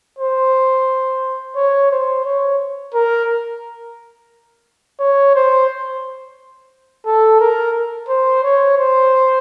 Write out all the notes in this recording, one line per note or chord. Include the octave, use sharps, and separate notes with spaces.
C5
C#5
C5
C#5
A#4
C#5
C5
A4
A#4
C5
C#5
C5